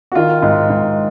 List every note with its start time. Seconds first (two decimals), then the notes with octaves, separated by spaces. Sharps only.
0.12 F#4
0.15 D#3 F4
0.42 G#2
0.70 G#2